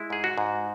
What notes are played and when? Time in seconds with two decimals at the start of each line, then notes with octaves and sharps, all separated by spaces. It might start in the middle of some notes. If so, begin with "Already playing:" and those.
Already playing: G#3 E4
0.10 G#2 G#4
0.24 F#4
0.38 G#2